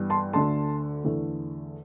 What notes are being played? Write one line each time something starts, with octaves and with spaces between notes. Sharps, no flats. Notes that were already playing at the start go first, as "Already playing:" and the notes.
Already playing: G2 E3 G3 B3
A5 C6
D2 D3 A3 A5 C6
E2 D3 A3